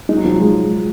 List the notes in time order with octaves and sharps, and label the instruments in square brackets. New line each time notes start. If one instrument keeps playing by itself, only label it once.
[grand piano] G#3 [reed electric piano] D#4
[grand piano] F#3
F3
F#3
[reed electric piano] G#3